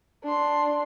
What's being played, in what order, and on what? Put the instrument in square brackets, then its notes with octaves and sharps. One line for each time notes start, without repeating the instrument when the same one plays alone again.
[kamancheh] D4 C6